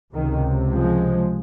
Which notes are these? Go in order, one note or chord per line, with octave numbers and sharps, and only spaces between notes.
C#2 C3 D#3
F3 G#3